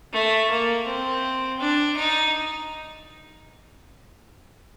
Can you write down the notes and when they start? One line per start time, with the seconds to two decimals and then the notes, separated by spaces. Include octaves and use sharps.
0.13 A3
0.50 A#3
0.86 C4
1.59 D4
1.96 D#4